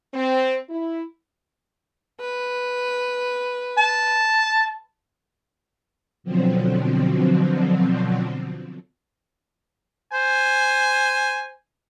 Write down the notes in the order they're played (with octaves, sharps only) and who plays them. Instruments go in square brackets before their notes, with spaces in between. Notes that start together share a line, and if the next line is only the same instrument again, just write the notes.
[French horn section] C4
E4
[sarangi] B4
[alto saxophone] A5
[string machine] B2 D3 F3 F#3 C4
[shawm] C5 [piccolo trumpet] G#5